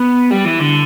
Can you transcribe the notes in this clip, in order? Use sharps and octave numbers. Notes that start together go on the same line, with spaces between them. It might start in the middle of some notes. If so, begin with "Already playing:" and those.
Already playing: B3
G3
E3
D3